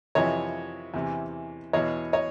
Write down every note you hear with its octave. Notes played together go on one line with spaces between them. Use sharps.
F2 C3 E3 C#5 D#5
E2 C3 E3
E2 B2 C#5 D#5
C#5 D#5